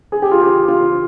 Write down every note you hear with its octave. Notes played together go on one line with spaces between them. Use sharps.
G#4
G4
F4
G4
F4